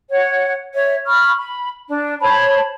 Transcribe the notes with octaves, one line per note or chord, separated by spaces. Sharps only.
C#5 F#5
C#5 E5
B5 C#6 F6
B5
D4
C5 C#5 A5 B5